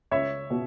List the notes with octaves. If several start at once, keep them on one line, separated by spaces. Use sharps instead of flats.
C#2 C#5 E5
B2